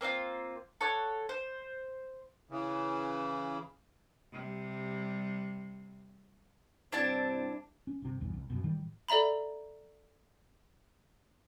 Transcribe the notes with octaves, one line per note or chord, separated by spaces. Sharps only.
A#3 C4 D#4 F4
A4 C#5 F#5
C5
C#3 E3
C3 G3
G2 C3 C4 D4 E4 A5
C#4
G1 C3
B1 E2 G2
C2
F#2 B2
A2 D#3 E3 G3
A4 D5 E5 A#5 B5